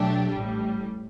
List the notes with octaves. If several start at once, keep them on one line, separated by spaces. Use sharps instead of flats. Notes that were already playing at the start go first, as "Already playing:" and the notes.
Already playing: B2 F#3 A3 D4 G4
A1 A2 G3